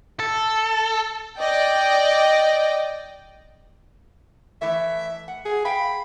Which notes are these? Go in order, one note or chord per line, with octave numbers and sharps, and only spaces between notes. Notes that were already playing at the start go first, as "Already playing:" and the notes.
A4
D5 D#5 G5
E3 A3 E5
F#5
G#4
F5 G5 B5